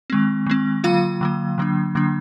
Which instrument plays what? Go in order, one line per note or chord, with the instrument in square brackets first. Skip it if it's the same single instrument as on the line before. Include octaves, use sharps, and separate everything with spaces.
[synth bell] D#3 G#3 C4
D#3 G#3 C4
D3 F#3 A#3 F4 F5
D3 F#3 A#3
D3 F#3 A#3 D4
D3 F#3 A#3 D4